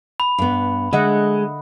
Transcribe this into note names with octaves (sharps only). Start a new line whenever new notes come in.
B5
G2 B3
D3 G#3 D#5 E5 F#5